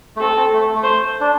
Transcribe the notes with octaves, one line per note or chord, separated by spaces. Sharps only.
A3
C4 A4
C4
A3
A3
C5
D4